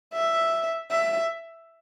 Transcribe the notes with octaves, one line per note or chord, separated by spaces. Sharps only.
E5
E5